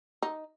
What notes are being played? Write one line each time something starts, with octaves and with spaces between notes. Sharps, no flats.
D#4